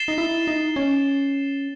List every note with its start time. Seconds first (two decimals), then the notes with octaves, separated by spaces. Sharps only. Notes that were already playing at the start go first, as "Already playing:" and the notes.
Already playing: A6 C7 E7 G7
0.08 D#4
0.18 E4
0.47 D#4
0.76 C#4